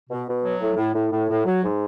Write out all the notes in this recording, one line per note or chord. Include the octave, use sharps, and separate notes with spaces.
B2
B2
F#3
A2
A2
A2
A2
A2
F#3
G#2